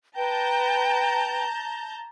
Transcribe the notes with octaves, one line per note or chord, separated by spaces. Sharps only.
B4 G5 A5 A#5 G6